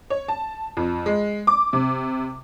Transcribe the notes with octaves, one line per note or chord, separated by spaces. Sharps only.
C#5
A5
F2
G#3
D6
C3